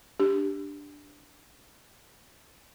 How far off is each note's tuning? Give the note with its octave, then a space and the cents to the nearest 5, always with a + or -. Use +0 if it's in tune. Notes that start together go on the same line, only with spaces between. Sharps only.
D4 +0 G4 +0